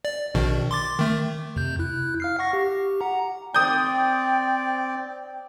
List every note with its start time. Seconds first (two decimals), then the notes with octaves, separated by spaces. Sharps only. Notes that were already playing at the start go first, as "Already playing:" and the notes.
0.05 D5
0.35 A#1 B2 D#3
0.71 C6 D6 A6
0.99 D#3 A3
1.56 F2 C3 G6
1.79 E4 F#6
2.20 F5 F6 C7
2.39 F#5 C#6 A#6
2.53 G4
3.01 F#5 A#5
3.54 C4 D5 G5 D#6 G6